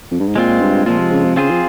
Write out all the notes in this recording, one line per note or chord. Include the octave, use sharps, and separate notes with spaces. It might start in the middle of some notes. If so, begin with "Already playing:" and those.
F2
G2
G#2
A#2 G#3 C4 F4
G2
A#2 F3 G#3 C4 F4
C3
C#3
C3
C#3 C4 F4 G#4 C5
F3